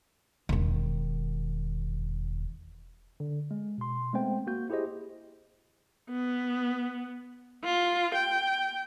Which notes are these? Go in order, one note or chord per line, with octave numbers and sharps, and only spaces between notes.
E1 D#3
D3
G#3
B2 C6
G#3 A3 B3 C4 C5 G5
A#3 F#4 G6
E4 G4 G#4 C5 D#5
B3
F4
G5